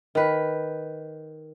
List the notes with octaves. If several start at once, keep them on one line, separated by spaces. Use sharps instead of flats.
D#3 B4